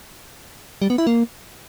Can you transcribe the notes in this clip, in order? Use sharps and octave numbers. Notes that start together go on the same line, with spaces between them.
G3
B3
E4
A#3